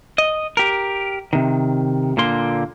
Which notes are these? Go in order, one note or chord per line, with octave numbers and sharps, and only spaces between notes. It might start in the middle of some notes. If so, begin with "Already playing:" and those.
D#5
G4 A#4
C3 D#3
A#2 D3 A#3 C6